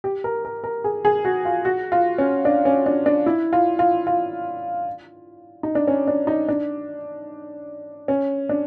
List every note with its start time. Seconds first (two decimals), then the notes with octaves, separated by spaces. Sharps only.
0.04 G4
0.24 A#4
0.45 A#4
0.64 A#4
0.84 G#4
1.05 G#4
1.25 F#4
1.45 F4
1.65 F#4
1.92 F4
2.18 C#4
2.45 D4
2.65 C#4
2.86 D4
3.06 D4
3.26 E4
3.53 F4
3.79 F4
4.07 F4
5.63 D#4
5.75 D4
5.88 C#4
6.07 D4
6.27 D#4
6.48 D4
8.08 C#4
8.49 D4